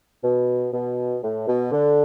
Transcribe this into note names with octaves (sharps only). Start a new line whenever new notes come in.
B2
B2
A2
B2
D3